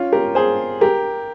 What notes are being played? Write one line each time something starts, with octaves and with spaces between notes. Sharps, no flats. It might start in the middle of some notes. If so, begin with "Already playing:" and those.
Already playing: C#4 F4
G4 A#4
G#4 C5
G4 A#4